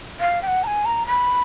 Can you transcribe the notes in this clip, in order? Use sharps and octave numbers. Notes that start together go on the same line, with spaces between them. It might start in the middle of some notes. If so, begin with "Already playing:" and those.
F5
G5
F#5
A#5
G#5
A#5
B5